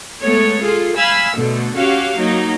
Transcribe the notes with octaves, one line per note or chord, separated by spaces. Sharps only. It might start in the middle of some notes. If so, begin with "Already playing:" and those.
G#3 A3 B3 C#5
F4 G#4 A4
F5 G#5 B5 E6
B2 D3 A3
C#4 F#4 G4 F5
F#3 A#3 D#4